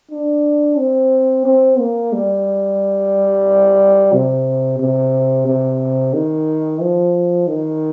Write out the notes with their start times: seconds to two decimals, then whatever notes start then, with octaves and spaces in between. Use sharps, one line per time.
0.11 D4
0.78 C4
1.45 C4
1.79 A#3
2.13 G3
4.12 C3
4.80 C3
5.46 C3
6.14 D#3
6.81 F3
7.47 D#3